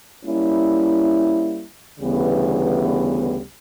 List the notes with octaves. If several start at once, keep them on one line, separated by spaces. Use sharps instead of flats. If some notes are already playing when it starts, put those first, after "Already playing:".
G3 A#3 C#4 E4
D2 C#3 E3 G3 B3